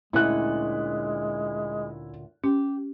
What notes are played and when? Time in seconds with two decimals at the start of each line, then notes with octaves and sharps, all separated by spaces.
0.13 D2 A#2 G#3 C#4 E4 F#6
2.44 C#4 G4